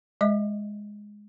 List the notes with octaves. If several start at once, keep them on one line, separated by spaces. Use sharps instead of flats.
G#3 D#5 E5